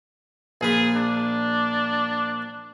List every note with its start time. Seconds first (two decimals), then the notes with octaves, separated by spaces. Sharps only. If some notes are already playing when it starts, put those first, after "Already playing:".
0.61 A#1 A#2 G#4 B5
0.96 D4